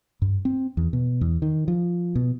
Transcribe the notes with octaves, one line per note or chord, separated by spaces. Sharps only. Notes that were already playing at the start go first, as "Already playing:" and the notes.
G2
C4
E2
B2
E2
D#3
F3
B2